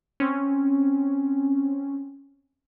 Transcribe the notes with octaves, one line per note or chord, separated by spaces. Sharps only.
C4 C#4